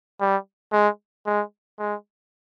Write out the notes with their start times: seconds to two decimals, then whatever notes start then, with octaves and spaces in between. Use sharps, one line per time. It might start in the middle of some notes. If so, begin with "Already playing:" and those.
0.20 G3
0.72 G#3
1.26 G#3
1.78 G#3